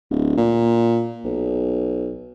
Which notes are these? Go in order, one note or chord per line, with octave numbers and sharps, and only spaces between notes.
D1
A#2
B1